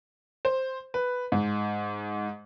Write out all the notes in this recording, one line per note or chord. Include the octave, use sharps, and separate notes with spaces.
C5
B4
G#2